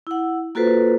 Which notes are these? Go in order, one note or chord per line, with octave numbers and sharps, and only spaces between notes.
E4 F#5
A#3 F4 F#4 A4 B4 C5